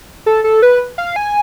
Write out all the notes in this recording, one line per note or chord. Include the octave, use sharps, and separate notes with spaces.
A4
A4
B4
F5
G#5